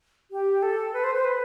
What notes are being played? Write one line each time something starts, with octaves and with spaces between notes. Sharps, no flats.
G4
A4
B4
C5
C5
B4